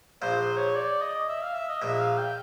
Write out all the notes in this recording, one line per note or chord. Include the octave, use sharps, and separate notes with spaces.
A#1 A#2 C5
C5
C#5
D5
D#5
E5
F5
E5
D#5
A#1 A#2 E5
F5
G5